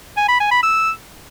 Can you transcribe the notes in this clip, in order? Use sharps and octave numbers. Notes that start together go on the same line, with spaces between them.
G#5
B5
G#5
B5
E6